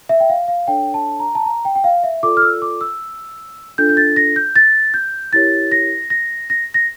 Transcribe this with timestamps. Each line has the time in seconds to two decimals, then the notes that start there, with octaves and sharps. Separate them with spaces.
0.09 E5
0.20 G5
0.29 F5
0.48 F5
0.67 D4 A4 C#5 G5
0.94 A5
1.20 A#5
1.35 A5
1.46 A#5
1.65 G5
1.75 G5
1.84 F5
2.03 E5
2.23 F4 A4 D5 D6
2.37 F6
2.42 E6
2.62 D6
2.81 E6
3.78 D4 F4 A4 G6
3.89 G6
3.97 A6
4.16 A#6
4.36 G6
4.56 A6
4.94 G6
5.33 E4 G4 A#4 C#5 A6
5.72 A#6
6.10 A#6
6.50 A#6
6.74 A#6